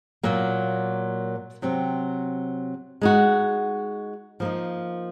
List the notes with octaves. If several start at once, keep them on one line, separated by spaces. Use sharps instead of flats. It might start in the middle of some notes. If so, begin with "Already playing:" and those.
A#2 F#3 A#3
C3 F#3 C4
G#3 D#4 F#4
F3 A#3 D#4